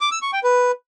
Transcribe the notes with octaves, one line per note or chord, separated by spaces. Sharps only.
D6
E6
C#6
G5
B4